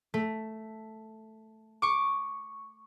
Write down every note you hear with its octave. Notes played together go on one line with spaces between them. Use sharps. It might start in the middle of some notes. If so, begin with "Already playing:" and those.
A3
C#6 D6